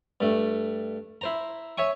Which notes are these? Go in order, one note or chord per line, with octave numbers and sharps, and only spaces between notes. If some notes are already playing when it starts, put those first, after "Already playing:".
G2 A3
E4 C5 A#5
C#5 E5 G#5 C#6